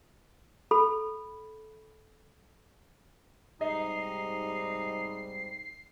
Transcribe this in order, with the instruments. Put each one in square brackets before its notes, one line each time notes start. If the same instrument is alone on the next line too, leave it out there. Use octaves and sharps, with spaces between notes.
[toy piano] A4 B5
[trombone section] G#2 C3 G3 [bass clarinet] D#4 [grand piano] D#5 [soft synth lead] C7